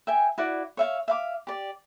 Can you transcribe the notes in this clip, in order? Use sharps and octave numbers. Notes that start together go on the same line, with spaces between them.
E5 G5 G#5
E4 F#4 D5
C#5 E5 F5
E5 F5 D6
G4 D5